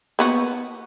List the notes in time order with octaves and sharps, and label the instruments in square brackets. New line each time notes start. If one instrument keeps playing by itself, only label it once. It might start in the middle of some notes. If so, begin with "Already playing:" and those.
[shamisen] A#3 B3 F#4